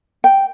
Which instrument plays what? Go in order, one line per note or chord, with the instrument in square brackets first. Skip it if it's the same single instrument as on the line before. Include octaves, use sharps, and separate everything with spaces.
[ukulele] G5